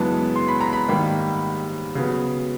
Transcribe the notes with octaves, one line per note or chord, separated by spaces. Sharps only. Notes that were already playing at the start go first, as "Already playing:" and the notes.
Already playing: F#2 C#3 E3 G#3 B3 A5
C6
B5
A#5
B5
G#2 D#3 G3 A#3
C#3 F#3 B3